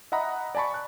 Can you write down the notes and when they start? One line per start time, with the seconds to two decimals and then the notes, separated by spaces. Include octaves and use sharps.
0.12 D#5 E5 F#5 A#5 B5 D#6
0.55 D5 G#5 A5 B5 C#6
0.74 F#6